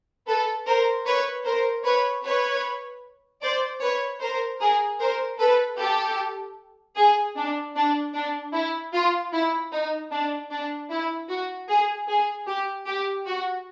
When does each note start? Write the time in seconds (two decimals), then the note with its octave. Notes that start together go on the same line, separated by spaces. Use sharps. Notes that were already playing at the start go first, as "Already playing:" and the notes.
0.27 A4 B4
0.66 A#4 C5
1.06 B4 C#5
1.45 A#4 C5
1.85 B4 C#5
2.24 B4 C#5
3.42 C5 D5
3.81 B4 C#5
4.20 A#4 C5
4.60 G#4 A#4
5.00 A#4 C5
5.39 A4 B4
5.78 G4 A4
6.96 G#4
7.36 D4
7.75 D4
8.14 D4
8.53 E4
8.93 F4
9.32 E4
9.71 D#4
10.12 D4
10.50 D4
10.90 E4
11.29 F#4
11.69 G#4
12.08 G#4
12.47 G4
12.87 G4
13.26 F#4